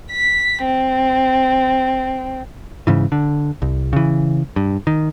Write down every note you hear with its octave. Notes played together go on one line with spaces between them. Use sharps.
B6
C4
G#2 C#3 E3
D3
C2
C#3 E3
G2
D#3